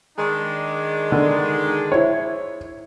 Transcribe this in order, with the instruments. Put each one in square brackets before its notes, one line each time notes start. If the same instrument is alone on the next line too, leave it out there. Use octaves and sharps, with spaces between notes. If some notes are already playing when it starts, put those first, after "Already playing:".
[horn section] D#3 G#3 D4
[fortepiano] D3
E4 C5 C#5